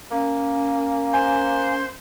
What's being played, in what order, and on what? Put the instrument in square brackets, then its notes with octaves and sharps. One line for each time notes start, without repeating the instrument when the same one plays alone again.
[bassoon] A#3 [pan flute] C#4
[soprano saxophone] C5 [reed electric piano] G#5